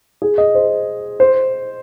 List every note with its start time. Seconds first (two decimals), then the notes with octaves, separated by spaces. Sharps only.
0.22 G#4
0.38 D#5
0.55 C5
1.20 C5